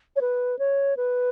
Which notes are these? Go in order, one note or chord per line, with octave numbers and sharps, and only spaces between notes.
C#5
B4
C#5
B4